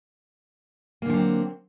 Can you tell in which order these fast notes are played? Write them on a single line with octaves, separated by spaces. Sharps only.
A#3 D3 F3 F#3 C4